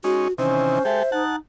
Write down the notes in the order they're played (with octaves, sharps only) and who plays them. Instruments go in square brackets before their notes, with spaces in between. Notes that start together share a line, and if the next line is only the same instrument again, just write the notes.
[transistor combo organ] G#3 C#4 D#4 [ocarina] F#4
[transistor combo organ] C3 D#3 E3 [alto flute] C#4 [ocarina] C5
[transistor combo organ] G#3 G4 A4 [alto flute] E5
[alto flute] D#4 [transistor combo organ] F#5 A5